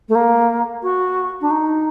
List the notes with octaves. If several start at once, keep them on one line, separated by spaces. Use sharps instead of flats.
A3
A#3
F#4
D4
D#4